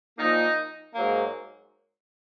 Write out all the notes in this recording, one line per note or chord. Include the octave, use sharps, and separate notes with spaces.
A#2 F3 A#3 D#4
G#2 F#3 A#3